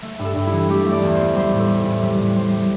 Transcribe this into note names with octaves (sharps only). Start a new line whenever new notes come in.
A3
G2
A4
G2
E4
E3
A3 G4
A3
D5
E2
C5
A3
G3 C5
A2
A4
G3
G4
A2
G3 B4
A2
G3 C5
G3